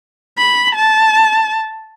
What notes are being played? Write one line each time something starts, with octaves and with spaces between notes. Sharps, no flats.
B5
A5